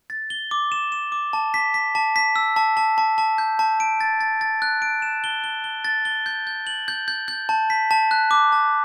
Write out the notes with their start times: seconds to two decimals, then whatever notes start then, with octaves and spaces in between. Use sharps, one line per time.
0.10 A6
0.30 G7
0.51 D6
0.72 E7
0.92 E7
1.12 D6
1.33 A5
1.54 B6
1.74 B6
1.95 A5
2.16 B6
2.36 E6
2.56 A5
2.77 A5
2.98 A5
3.18 A5
3.38 G6
3.59 A5
3.80 D7
4.01 A6
4.21 A6
4.41 A6
4.62 F#6
4.82 D7
5.02 E7
5.24 G7
5.44 G7
5.64 G7
5.85 A6
6.05 G7
6.26 G6
6.47 G6
6.67 F#7
6.88 G6
7.08 G6
7.28 G6
7.49 A5
7.70 B6
7.91 A5
8.11 F#6
8.31 D6
8.52 A5